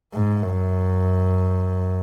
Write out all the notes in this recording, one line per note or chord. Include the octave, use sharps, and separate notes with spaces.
G#2
F#2